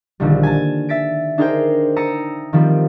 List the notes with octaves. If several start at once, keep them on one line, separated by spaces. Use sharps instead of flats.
A#1 D3 D#3 G3
G#5 A5
E5 A6 B6 D7
D4 D#4 G#4 A#4 C5 G5
A5 A#5 D#6 E6 C#7
D#3 F3 G3 C4